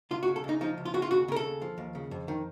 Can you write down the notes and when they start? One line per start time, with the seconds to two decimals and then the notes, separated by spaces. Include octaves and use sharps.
0.11 C#2 F4
0.23 F#4
0.28 C#3
0.36 A4
0.44 C#2
0.49 D#4
0.61 F3 D#4
0.78 C#2
0.85 F4
0.94 C#3 F#4
1.02 F4
1.11 D#2 F#4
1.28 C#3 A#4
1.36 A4
1.44 D#2
1.62 F3
1.78 D#2
1.95 C#3
2.11 F2
2.28 D#3